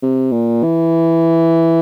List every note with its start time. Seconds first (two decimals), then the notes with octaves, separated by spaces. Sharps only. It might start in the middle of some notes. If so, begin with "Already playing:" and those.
0.02 C3
0.32 A#2
0.63 E3